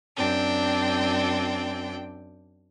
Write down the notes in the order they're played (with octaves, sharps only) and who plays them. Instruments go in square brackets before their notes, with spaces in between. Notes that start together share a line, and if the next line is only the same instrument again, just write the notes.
[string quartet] F#2 C4 D4 G5